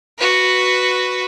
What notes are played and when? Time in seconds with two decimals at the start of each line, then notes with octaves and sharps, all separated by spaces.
0.18 F#4 B4